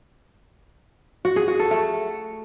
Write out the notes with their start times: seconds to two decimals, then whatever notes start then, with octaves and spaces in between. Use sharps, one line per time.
1.25 F#4
1.36 G#4
1.48 F#4
1.59 A4
1.71 A3